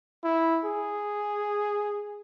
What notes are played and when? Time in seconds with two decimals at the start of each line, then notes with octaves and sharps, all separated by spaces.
0.24 E4
0.65 G#4